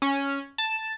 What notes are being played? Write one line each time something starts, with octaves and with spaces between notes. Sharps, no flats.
C#4
A5